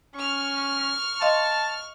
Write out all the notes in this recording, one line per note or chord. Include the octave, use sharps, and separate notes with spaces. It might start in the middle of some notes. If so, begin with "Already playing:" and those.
C#4 C#6 F6
D#5 F5 A5 C6